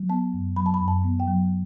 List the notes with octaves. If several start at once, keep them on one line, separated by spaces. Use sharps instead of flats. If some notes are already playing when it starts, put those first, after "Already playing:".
Already playing: F#3
B3 A5
F#2
F#3 B5
A5
B5
F#2
A5
B3
G5
F#3